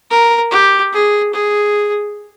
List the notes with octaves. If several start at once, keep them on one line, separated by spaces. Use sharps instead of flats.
A#4
G4
G#4
G#4